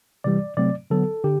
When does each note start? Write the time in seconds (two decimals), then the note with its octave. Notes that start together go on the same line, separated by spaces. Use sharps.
0.24 C3 E3 G3 D5
0.57 C3 F#3 A3 C4 D5
0.90 D3 F#3 B3 A4
1.24 D3 G4